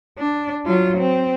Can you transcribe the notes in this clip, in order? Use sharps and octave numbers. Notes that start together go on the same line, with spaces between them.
D4
F#3 F4
C4